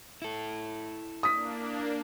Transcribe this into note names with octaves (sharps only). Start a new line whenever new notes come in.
E4 A4
A#3 D4 D#6 B6